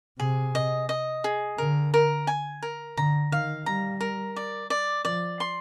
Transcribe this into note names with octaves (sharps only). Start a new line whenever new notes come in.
C3 G#4
D#5
D#5
G#4
D3 A#4
A#4
G#5
A#4
D3 A#5
D#3 F5
G3 A#5
A#4
D5
D5
F3 D5
C6